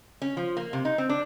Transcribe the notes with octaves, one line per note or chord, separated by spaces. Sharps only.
C#4
F3
A#3
C3
D#4
C4
D4